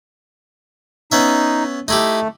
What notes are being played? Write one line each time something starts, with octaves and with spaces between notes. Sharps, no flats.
B3 C#4 D#4 E5
A3 D#4 E4 G4